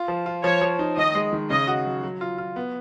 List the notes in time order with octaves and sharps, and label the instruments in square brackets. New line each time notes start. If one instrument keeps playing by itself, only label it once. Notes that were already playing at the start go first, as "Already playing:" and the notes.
Already playing: [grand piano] F4
F3
F4
[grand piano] F3 [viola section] C#5
[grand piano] F3
D#4
[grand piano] D#3 [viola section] D#5
[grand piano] G#3
D#3
[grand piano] C#3 [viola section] D#5
[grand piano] F#4
F#3
F#3
F4
F4
B3